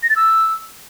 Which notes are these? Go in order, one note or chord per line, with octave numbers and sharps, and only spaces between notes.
A#6
A6
E6